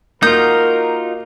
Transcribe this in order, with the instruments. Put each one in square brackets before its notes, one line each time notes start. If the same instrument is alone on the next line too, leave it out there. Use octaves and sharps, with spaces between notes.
[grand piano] A#3 [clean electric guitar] D#4 F4 [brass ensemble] F#4 A#4 [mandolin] D#6 G6